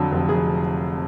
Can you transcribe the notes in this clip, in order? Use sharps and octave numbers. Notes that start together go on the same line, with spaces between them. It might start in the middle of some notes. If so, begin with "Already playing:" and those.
Already playing: F2 D3 F#3
F1
F1 G#4